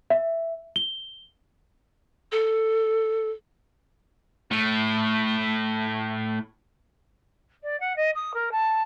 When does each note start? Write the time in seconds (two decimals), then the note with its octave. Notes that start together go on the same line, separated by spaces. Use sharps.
0.10 E5
0.76 G7
2.32 A4
4.51 A2 A3
7.63 D5
7.80 F#5
7.96 D#5
8.14 D#6
8.34 A#4
8.51 A5